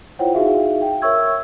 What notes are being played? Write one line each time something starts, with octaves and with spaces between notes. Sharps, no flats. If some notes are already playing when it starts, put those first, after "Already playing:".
E4 F4 C5 C#5 F#5 G5
D#4 E4 F#4 G#4 E5 F5
G5
A#4 C#5 E5 C#6 E6 G#6